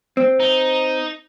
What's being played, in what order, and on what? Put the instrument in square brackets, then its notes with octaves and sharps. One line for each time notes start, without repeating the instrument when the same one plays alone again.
[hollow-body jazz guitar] C4
[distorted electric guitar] D#4